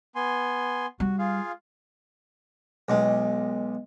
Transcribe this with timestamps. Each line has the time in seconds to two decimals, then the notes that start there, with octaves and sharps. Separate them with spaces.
0.15 B3 G#5 C6
1.00 G3 F#4
1.19 F4 G#4 F5
2.88 B1 G#3